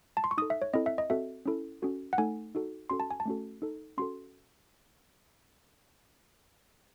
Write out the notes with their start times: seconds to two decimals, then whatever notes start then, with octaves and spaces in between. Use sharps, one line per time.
0.17 A5
0.24 C6
0.31 C#6
0.38 D#4 D#6
0.42 A4
0.50 E5
0.62 C#5
0.74 C4 E4 A4 D#5
0.86 E5
0.98 D#5
1.10 C4 F#4 A4 E5
1.46 C#4 E4 A4
1.82 C#4 F#4 A4
2.13 F#5
2.18 A3 D#4 A4 G#5
2.55 D#4 F#4 A4
2.90 C#4 F#4 A4 C6
3.00 A5
3.11 G#5
3.20 A5
3.26 A3 C#4 F#4 A4
3.62 D#4 A4
3.98 C#4 F#4 A4 C6